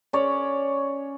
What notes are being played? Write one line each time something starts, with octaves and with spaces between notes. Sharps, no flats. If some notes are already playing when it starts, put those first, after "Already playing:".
C#4 C#5 D5